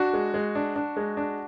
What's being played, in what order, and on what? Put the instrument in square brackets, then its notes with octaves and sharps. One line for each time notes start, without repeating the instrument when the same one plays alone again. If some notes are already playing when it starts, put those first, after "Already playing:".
Already playing: [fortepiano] D4 [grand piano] F#4
[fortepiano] G#3
G#3
D4
D4
G#3
D4